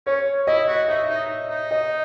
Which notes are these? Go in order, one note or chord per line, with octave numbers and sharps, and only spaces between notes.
C#4 C#5
E4 D#5
F#4
D#4 E5
D#4
D#4
D#5